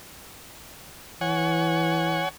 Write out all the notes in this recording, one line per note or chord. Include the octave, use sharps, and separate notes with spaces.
E3 C#5 F#5 G#5